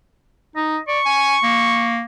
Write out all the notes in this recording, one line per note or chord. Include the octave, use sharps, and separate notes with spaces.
D#4 D#5
D5 C#6
G#5
A#3